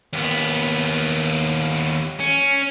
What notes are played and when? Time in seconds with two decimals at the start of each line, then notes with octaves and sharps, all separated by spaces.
0.13 D#2 B3
2.20 C#4